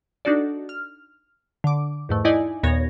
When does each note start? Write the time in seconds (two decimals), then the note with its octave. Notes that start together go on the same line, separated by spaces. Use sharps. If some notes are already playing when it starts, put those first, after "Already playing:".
0.25 D4 D#4 F#4 A4 D5
0.69 F6
1.64 D3 D6
2.09 E2 G#2 A3
2.25 D#4 E4 D5 D#5 G#5
2.63 D#2 A#2 B3 C#5 G#6 A#6